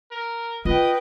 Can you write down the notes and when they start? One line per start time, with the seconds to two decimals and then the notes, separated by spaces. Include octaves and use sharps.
0.11 A#4
0.65 F4 B4 D#5 G5